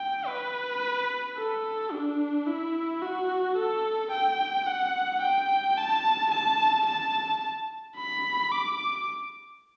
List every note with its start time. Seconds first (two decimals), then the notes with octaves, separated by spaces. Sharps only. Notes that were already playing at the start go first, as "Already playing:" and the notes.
Already playing: G5
0.27 B4
1.37 A4
1.92 D4
2.47 E4
3.02 F#4
3.57 A4
4.12 G5
4.67 F#5
5.22 G5
5.78 A5
6.32 A5
6.86 A5
7.97 B5
8.52 D6